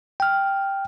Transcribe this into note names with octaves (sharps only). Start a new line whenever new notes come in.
G5 F6